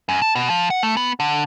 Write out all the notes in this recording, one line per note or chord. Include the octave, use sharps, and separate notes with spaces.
F#2
A5
B2
F3
F#5
A3
B3
D3